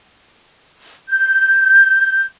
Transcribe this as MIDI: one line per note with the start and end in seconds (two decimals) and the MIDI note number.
1.10 2.24 91